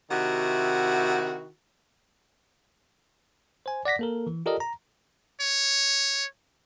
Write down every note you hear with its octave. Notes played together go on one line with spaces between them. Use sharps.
C3 D#3 E4 F#4
C5 G#5
D5 F#5 A#6 B6
A#3 A4 A#4
E3
F4 G4 A4 A#4 D5 D#5
A#5
C#5